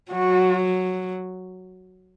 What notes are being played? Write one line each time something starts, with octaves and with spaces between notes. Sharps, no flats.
F#3 F#4